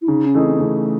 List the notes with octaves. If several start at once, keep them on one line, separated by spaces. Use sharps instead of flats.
E4
C#3 D#4
C#4
E3 A3 D#4 G#4
C4
C4
C#3 A3